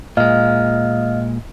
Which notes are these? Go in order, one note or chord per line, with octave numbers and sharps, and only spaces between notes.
A#2 G#3 D#5 F5 F6